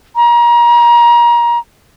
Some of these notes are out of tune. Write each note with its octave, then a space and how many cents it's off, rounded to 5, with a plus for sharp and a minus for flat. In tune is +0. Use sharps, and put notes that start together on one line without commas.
A#5 +30